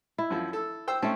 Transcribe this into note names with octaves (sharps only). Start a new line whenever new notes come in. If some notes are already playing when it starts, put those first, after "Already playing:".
E4
F#2 F3
A4
C5 G5 E6
A3 C4 C#4 A5